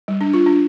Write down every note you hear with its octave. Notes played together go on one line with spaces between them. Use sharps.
G3
D4
F4
D4